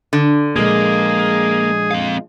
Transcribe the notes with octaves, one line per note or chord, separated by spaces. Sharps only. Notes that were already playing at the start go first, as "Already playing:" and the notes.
D3
A#2 F3 G#3 A#3 G#4
C4 F5